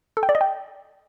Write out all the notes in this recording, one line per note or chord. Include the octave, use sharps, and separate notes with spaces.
A4
G5
D5
D#5
G5